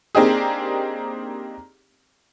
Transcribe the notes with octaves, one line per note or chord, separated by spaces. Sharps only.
A#3 C4 D4 D#4 G4 G#4